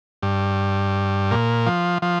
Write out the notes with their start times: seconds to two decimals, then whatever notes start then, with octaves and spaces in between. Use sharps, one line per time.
0.23 G2
1.31 A#2
1.66 F3
2.02 F3